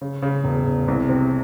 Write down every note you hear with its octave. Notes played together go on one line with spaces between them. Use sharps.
C#3
C#3
E1
E1
C2
C3